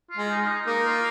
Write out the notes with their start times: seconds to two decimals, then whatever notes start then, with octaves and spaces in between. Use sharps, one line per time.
0.11 F4
0.17 G#3
0.30 D#4
0.42 F4
0.48 D#4
0.67 A#3 D#4
0.85 F4